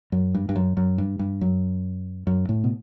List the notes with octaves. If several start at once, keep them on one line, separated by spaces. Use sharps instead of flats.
F#2
G2
G2
F#2
F#2
G2
G2
F#2
F#2
A2
B2